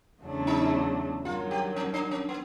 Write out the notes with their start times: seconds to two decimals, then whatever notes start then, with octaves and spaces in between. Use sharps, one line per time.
0.22 E2 C#3 F#3 A3 D4
0.47 D#4
1.25 G2 D#3 F#3 F4
1.51 G4
1.76 C#4
1.94 D4
2.11 C#4
2.29 B3